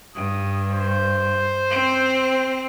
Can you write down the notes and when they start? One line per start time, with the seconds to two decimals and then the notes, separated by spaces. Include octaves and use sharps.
0.16 G2 D#6
0.70 C5
1.70 C4